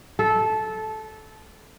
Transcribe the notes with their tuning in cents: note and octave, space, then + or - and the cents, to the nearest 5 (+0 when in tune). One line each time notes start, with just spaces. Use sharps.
A4 -15